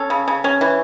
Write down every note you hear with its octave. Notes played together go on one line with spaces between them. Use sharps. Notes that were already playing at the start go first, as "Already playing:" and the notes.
Already playing: C#4 A4
C#3
C#3
C#4
E3